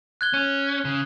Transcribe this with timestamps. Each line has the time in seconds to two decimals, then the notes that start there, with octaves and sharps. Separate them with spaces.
0.21 F#6 G#6 G7
0.34 C#4
0.85 C#3